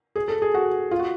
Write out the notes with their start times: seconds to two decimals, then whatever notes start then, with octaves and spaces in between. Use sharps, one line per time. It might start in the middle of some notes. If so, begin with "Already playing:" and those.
0.16 G#4
0.28 A4
0.42 G#4
0.54 F#4
0.91 F4
0.99 F#4